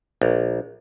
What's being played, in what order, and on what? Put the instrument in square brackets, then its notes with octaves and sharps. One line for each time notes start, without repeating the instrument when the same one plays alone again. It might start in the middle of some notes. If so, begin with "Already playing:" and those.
[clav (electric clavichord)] A#1